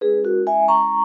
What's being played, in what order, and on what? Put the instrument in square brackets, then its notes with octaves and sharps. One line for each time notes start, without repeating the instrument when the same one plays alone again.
[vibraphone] G#3 C#4 E4 G#4 B4
F#4 A#4
E5 G#5
A#5 C#6